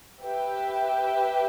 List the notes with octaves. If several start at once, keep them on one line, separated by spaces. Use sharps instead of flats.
G4 B4 E5 G5